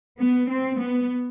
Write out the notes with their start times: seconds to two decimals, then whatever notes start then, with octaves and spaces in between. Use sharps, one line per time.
0.19 B3
0.49 C4
0.79 B3